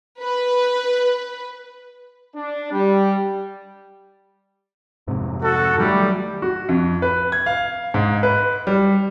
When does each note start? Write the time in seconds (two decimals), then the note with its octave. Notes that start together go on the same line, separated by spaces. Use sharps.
0.22 B4
2.36 D4
2.72 G3
5.08 F2 G#2 C3
5.41 F#4 A4
5.78 D#3 F#3 G3 A3
6.42 F#4
6.69 F2
7.02 B4
7.32 G#6
7.46 F5
7.94 G#2
8.23 B4
8.67 G3